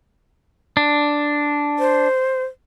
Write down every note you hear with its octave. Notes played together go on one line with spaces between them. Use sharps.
D4
C5